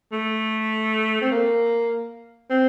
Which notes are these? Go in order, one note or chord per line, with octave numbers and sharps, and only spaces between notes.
A3
C4
A#3
C4